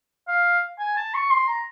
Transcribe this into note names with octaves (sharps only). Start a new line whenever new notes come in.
F5
G#5
A5
C#6
C6
A#5